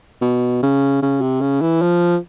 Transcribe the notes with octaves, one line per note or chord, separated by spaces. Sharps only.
B2
C#3
C#3
C3
C#3
E3
F3